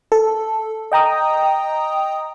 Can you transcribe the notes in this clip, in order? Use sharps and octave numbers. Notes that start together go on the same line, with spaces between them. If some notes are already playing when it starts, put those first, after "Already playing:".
A4
D#5 G5 A#5 D#6